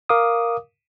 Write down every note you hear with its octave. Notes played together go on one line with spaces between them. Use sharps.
A#4 F5 D6 D#6